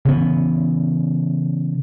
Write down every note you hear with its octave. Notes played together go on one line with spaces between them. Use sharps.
C#3 E3 B3